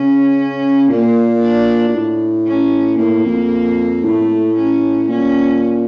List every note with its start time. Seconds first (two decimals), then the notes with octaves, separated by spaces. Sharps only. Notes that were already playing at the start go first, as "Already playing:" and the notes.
Already playing: C#3 C#4
0.90 A#2 A#3
1.42 D4
1.88 A#2
1.94 A2
2.46 C#4
2.98 A2 A#3
3.25 F2
4.03 A2 A3
4.56 C#4
5.08 A#2 C#4